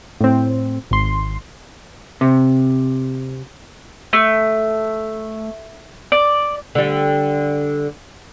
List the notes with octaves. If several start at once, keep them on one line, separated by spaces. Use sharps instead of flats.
A2 C4
G#1 C6
C3
A3
D5
D3 G3